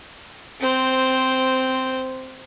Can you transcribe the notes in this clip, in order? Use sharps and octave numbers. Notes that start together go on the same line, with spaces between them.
C4 C5